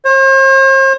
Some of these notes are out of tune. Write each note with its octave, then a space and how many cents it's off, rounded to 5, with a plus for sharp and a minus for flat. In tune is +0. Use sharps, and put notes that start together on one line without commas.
C5 +45